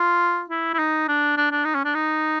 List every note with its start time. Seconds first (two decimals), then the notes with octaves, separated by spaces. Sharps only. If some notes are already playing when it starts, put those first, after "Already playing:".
Already playing: F4
0.50 E4
0.73 E4
0.79 D#4
1.08 D4
1.37 D4
1.52 D4
1.65 D#4
1.75 C#4
1.85 D4
1.94 D#4